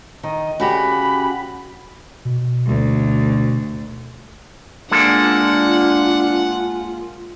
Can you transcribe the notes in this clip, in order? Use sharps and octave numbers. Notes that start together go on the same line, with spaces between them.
D#3 D#5
C#3 F#4 G4 B5
B2
D2
G#3 A#3 D4 F4 A4 F#5